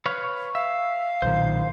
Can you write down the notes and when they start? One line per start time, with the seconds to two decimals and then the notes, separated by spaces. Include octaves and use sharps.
0.06 B4 C#5 F5
0.55 E5 F5
1.22 B1 A#2 D#3 C5